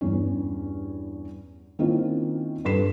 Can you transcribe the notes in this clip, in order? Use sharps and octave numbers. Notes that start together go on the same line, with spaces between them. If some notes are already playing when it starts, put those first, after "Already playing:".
E2 G2 C#4
D#3 A#3 C4 C#4 E4 F4
G2 A4 B4 B6 C7 E7